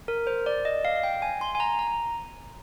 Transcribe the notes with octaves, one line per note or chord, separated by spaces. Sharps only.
A#4
C5
D5
D#5
F5
F5
G5
G#5
C6
G#5
A#5
A#5